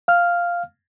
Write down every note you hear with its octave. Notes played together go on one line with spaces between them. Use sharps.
F5 F6